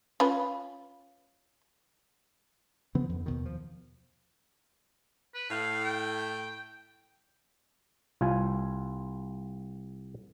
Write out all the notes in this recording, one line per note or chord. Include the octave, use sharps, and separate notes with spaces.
C#4 F4 B4
C#3 F3 B3 C4
F2
D#2 B2 D#3
F3
B4
A2 F5
G5
C2 F4 G#5